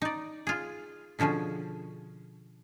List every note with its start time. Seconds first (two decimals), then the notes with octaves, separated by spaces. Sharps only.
0.02 D#4 D5
0.47 F4 G#4
1.19 B2 D3 F3 C#4 G#4